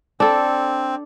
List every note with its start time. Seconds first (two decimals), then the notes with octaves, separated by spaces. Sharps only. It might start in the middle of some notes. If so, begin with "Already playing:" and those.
0.20 C4 D4 A4